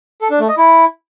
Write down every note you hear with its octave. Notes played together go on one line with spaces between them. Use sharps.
A4
D4
A3
D#5
E4